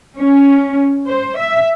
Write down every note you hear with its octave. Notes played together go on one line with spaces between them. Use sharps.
C#4
C5
E5